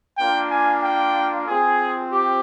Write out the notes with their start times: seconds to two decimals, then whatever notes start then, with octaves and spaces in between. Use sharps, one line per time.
0.18 A#3 D4 F4 G5
0.51 G#5
0.83 G5
1.47 C4 F4 G#4
2.11 G4